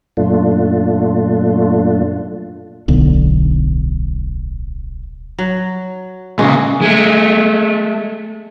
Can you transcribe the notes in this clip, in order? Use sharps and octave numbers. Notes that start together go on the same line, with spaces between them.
F#2 A#2 A3 D4 F4
D1 B1 D3
F#3
A#2 C#3 G#3 F#4
G#3 A3